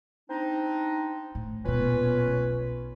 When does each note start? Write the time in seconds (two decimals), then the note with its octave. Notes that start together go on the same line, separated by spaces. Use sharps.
0.30 C4 D4 D#4
1.35 A2
1.65 D#1 B2 C#4 F4 B4
2.27 B1